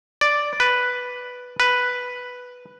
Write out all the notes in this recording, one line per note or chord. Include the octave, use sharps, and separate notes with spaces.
D5
B4
B4